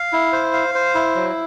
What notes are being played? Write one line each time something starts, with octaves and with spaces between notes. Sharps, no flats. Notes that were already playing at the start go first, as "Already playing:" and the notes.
Already playing: F5
E4
C5
F5
C5
E4
F#3